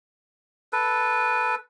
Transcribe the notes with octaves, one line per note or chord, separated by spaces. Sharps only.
A4 B4